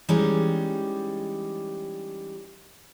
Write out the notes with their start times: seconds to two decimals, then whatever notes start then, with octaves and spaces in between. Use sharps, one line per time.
0.09 E3 G3 G#3 C#4 D#4 G4